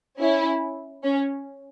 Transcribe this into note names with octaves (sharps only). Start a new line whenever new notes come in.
C#4 E4
C#4